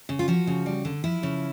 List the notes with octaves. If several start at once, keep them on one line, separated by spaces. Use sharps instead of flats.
C#3
F4
F3 F#4
C#3
G3
D3
F3 E4
C#3